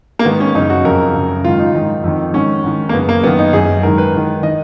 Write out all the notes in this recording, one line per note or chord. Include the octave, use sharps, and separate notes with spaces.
A#3
G#2 D#3 B3
C#4
F#2 C#3 D#4
F#4
F2 C#3 A#4
F#2 C#3
G#2 D#3 F4
D#4
G#2 D#3
F2 D#3
G#2 D#3 C#4
G#2 D#3
A#3
F#2 C#3 B3
A#3
F#2 D#3 B3
D#4
F#2 D#3 G#4
G#2 D#3 A#4
B4
G#2 D#3
D#3 D#5